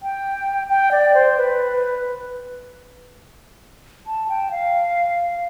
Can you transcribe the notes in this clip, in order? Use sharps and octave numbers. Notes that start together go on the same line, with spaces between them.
G5
G5
D5
C5
B4
A5
G5
F5